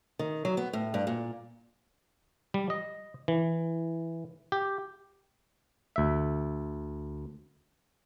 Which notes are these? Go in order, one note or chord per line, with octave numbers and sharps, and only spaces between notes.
D#3
F#3
B3
A2
G2
A#2
G3
D#5
E3
G4
D2 E5